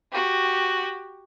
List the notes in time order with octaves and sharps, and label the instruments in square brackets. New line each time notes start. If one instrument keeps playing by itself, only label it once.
[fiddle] F#4 G4